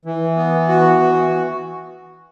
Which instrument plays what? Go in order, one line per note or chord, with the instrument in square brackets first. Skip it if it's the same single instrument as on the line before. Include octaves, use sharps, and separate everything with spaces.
[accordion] E3
B3
F#4
E3